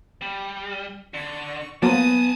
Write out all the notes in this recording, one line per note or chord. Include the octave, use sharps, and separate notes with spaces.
G3
D3 C#6
F3 F#3 A#3 B3 G#5 A5 D#6 D#7